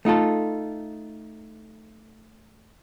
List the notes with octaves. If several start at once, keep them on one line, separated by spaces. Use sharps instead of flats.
A3 D#4 F4 A4